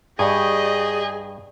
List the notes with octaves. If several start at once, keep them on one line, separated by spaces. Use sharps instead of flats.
G2 G4 G#4 D5 D#5 G#5 C#6